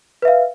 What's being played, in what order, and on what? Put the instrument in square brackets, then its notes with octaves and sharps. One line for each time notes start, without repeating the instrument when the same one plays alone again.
[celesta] B4
E5
F5